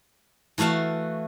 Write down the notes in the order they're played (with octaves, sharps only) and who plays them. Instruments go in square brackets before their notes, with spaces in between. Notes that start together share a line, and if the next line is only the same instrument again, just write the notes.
[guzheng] E3 A3 F#4 F5 A5